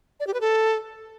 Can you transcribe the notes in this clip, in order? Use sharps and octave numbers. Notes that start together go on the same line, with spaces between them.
D5
G4
B4
A4